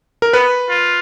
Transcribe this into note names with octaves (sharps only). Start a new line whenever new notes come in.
A#4
B3 B4
F4